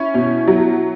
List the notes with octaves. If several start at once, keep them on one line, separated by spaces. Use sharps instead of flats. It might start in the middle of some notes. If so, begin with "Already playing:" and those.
Already playing: C#4 E4
B2
F#3